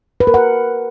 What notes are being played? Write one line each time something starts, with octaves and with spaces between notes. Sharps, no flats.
B4
A#4
F#5